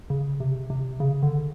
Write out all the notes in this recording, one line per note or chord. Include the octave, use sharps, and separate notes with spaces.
C#3
C3
C3
C#3
D3